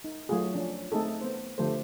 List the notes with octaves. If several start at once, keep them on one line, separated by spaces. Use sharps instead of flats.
D#4
F#3 A3 F4 F#4 G#4
F3 C#4 D4
A3 C4 D#4 G#4 A4
B3 C5
D3 F3 A3 G4 A4 C5